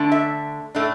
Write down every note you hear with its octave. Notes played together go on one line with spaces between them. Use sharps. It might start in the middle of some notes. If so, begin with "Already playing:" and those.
Already playing: D3 A3 D4
E5
A2 A3 D4